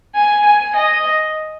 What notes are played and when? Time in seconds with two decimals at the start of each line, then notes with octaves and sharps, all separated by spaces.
0.15 G#5
0.45 G#5
0.75 D#5